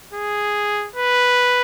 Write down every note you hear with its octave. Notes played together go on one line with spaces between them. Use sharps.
G#4
B4